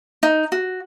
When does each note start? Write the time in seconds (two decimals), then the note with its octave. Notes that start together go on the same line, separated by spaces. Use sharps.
0.23 D#4
0.52 F#4